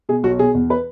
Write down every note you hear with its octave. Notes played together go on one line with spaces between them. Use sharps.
B2 G#4
B1 F#4
B2 G#4
E2
B4